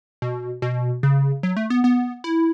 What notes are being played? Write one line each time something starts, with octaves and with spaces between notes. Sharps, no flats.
B2
B2
C#3
F#3
A3
B3
B3
E4